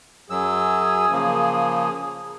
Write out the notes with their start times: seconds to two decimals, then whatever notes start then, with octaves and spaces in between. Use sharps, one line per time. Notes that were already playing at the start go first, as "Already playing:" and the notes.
0.30 F#2 F#3 G#4 E6
1.12 C#3 F3 A#3